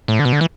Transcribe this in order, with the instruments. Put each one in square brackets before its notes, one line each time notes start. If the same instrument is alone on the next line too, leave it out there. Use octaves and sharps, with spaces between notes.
[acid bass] A2
D3
B2
D3
E3